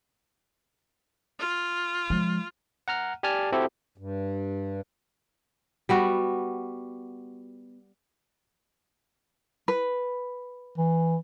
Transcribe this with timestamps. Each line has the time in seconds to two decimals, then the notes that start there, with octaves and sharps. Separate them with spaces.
1.39 F4
2.10 F3 G#3
2.88 F#5 A#5 F6
3.23 G4 D5 G#5 A5 F6
3.52 C4 E4 F#4 G4 A4 C5
3.98 G2
5.89 G3 B3 F#4
9.68 B4
10.78 E3